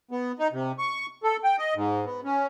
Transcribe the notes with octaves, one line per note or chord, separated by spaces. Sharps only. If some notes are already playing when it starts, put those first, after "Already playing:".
B3
D#4
C3
C#6
A4
G5
D#5
G#2
B3
C#4